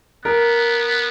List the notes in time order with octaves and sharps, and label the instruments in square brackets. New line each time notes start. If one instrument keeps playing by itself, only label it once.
[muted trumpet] B3 [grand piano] A#4